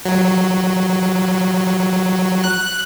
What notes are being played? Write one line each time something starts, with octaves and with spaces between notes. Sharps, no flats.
F#3
F#6